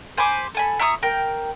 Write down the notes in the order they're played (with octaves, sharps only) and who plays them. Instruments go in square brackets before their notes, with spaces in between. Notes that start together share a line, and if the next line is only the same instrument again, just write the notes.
[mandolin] C5 G#5 B5 D6
A4 G#5 B5
E4 A#5 C#6 D#6
A#4 G5